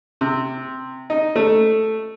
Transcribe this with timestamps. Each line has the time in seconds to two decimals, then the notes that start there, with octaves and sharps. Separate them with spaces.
0.21 C3
1.10 D#4
1.36 A3